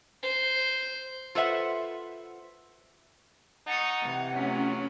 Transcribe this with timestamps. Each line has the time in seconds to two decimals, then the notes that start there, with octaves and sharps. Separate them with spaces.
0.23 C5
1.35 F4 A4 B4 C5 E5 F#5
3.67 D#4 F#5 A5 C#6 D#6
4.01 C3 E3
4.35 F#3 A3 C#4 F4